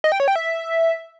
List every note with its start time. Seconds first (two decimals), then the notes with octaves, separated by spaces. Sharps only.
0.04 D#5
0.12 G5
0.20 C#5
0.28 G5
0.36 E5